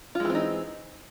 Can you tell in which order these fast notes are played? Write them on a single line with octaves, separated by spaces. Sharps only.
F4 G#3 E3 C4 D#4